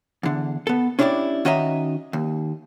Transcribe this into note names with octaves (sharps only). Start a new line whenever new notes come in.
E2 D3
B3 A4
C#4 D4 E4 G4 C5 D5
D#3 C#4 F#4 D#5 E5 A#5
D#2